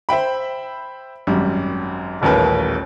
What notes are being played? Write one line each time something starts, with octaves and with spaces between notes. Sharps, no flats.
C5 E5 G5 B5
G#1 F#2 G3
D#1 A1 D#2 A#4 B4